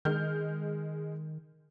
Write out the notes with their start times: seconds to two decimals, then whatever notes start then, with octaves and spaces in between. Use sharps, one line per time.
0.05 D#3 G#3 F6 G6